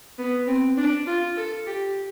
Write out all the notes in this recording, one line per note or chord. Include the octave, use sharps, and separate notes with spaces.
B3
C4
D4
F4
A4
G4